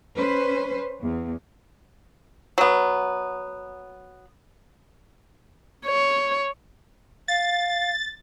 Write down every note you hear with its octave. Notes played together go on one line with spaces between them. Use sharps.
C#4 B4 C5
E2
F#3 B3
C#5
F5 A6